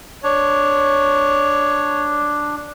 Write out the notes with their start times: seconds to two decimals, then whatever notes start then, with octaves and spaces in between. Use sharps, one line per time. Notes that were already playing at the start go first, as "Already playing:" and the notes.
0.24 D4 C#5